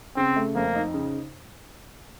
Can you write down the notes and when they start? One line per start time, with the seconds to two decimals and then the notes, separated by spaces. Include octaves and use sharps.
0.16 C#3 C4
0.36 A3
0.55 F2 A#3
0.75 D#4
0.94 C#3